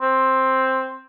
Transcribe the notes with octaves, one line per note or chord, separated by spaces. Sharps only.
C4